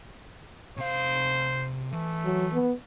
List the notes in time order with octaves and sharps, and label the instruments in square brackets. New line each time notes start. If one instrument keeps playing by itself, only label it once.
[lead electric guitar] C3 F5 [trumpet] C5
[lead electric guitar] E3 [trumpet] A3
[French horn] F#3
B3